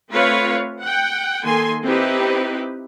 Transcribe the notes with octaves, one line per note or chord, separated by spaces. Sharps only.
A3 C4 F4 B4 C#5 F5
F#5 G5
D#3 A#3 A4 G#5 C6
C4 D#4 E4 G4 B4